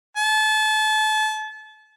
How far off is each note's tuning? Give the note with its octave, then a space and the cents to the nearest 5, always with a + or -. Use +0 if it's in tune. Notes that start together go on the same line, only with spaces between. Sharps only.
A5 -30